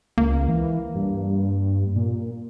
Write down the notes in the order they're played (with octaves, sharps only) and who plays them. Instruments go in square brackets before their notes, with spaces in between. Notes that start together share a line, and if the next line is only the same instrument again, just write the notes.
[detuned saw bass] C#2 [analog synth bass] A#3
[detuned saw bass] E3
G2
A#2